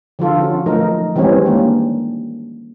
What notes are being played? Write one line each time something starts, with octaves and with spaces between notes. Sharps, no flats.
D3 F3 F4 A4
C#4 F#4
F3 F#3 A3 D#4 A#4
E3 G3 G#3 C4 C#4 C#5
D#3 G#3 A#3 D4